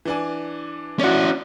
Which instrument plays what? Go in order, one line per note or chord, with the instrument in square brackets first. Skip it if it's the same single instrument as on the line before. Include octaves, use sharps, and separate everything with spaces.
[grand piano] E3 D4 G#5
[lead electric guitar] C#4 E4 [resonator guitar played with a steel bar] F#4 D5